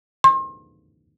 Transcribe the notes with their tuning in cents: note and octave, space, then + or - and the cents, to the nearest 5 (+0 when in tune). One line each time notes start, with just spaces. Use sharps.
C6 +35